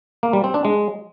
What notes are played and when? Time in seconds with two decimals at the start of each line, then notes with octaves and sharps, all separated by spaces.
0.23 A#3
0.33 G3
0.44 C4
0.54 D4
0.65 G#3